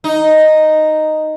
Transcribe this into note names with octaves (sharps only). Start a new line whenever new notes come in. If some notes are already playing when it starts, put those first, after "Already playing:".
D#4